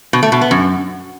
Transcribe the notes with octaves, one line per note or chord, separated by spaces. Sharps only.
B2
A3
B2
B3
F#2